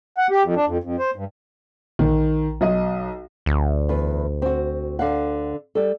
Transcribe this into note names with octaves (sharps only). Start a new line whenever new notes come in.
F#5
G4
F2
D4
F2
F2
C5
G2
A#1 D#3
B1 D#5
D2
E2 B4
C4 F#4
D3 F5 F#5
G3 A4